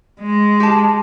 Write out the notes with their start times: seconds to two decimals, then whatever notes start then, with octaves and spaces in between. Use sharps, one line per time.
0.21 G#3
0.60 G4 A5